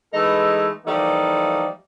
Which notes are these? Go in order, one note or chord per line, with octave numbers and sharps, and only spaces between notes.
E3 G#3 A3 D#4 A4 B4
E3 F3 G3 A3 A#3 D#4